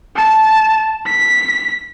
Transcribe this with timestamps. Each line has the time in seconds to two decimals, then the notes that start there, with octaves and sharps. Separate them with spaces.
0.16 A5
1.06 B6